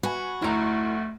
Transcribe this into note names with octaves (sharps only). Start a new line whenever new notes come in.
F#4 B4 G#5
F1 D2 A3 E4 A#5